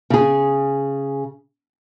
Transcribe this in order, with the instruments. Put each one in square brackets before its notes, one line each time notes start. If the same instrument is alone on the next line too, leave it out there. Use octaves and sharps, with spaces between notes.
[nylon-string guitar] C#3 G#4